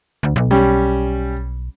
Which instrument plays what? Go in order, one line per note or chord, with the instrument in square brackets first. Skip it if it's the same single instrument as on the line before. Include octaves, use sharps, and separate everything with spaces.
[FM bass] D2
B1
[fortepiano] G3 C#4